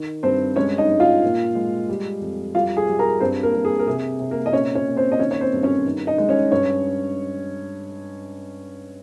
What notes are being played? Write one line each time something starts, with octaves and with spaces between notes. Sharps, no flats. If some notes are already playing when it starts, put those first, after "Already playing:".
Already playing: D#3
G2 C4 C5
G#3 C#4 C#5
D#4 D#5
G#3
F4 F5
A#2
G#3
G3
F2
G3 F4 F5
G#4 G#5
G3
A#4 A#5
G2 C4 C5
A#3 A#4
G2
G#4
A#4
C3 G#4
C3
A#3 A#4
D#5
A#2 C#4 C#5
C#4 C#5
A#2
C4 C5
D#5
D#3 C#4 C#5
C#5
C4 C5
G2
C#4 C#5
D#3
D#4 D#5
G#3
C#4 C#5
G2 C#4 C#5